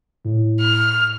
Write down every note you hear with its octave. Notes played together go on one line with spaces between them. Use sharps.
A2
F6